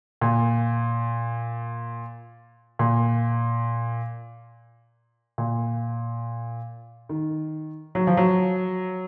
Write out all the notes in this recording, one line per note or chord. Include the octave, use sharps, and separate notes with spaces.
A#2
A#2
A#2
D#3
F#3
F3
F#3